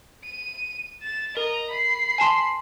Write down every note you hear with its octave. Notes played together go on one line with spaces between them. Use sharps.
D#7
A6 E7
A#4 D#5 A#5
B5 C7
G#5 A5 C6